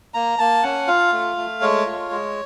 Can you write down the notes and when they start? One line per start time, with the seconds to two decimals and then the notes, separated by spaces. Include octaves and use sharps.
0.14 A#3 A#5
0.38 A#3 A5
0.63 C#4 F#5
0.87 F4 F5
1.13 A3
1.37 A3
1.61 G#3 C#5
1.86 F4
2.10 G#3